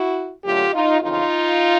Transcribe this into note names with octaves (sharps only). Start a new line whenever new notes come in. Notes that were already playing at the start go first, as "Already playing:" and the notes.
Already playing: E4 F#4
F#2 D3 F#3 A3 F4 G4
D#4 F4
F2 C#3 E3 D#4 F4